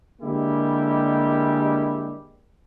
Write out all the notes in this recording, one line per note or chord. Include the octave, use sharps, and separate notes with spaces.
D3 G3 G#3 A#3 E4 G4